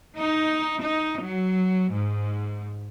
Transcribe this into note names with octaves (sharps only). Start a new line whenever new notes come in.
D#4
D#4
F#3
G#2